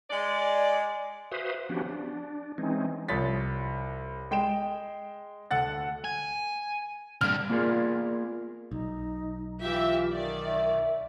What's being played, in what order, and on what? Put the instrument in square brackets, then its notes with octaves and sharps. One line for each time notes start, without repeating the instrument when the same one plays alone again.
[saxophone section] G#3 D5
[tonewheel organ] F#4 B4 C5 E5 F5 D#6
F3 B3 C#4 D4 F#4 G4
D4
E3 G#3 C4 C#4 D#4
[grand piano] C2 F3 C#5 A6 B6
G#3 G5 D7 E7
D2 A4 F#5 A6
[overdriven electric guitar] G#5
[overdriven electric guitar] G2 D3 [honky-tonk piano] F6
[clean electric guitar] A#3 B3 F4 G#4 A#4 D5
[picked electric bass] B1 [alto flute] D#4
[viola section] E3 G4 E5 [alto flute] F4
[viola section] D#3 D5
[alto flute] E5